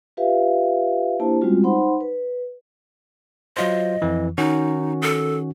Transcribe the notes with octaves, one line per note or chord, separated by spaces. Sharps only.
F4 G4 B4 E5 F5
A#3 D4 E4 G4 C5 A5
G3 G#3 C4 C#4 F4 F#4
D#4 C5 F#5 B5 C6
B4
F#3 F4 C5 D#5
F2 E3
D#3 C#4 D#4 F#4
A4